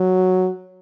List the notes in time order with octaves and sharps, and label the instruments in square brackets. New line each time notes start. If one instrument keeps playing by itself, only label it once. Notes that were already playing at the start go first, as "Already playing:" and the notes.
Already playing: [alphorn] F#3